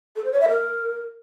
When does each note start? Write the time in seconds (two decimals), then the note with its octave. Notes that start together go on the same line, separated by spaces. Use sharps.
0.16 A4
0.24 C5
0.32 C#5
0.41 E5
0.49 A#4